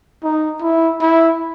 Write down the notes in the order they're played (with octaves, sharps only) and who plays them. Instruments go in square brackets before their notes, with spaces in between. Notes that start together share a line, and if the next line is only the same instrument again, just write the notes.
[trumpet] D#4
E4
E4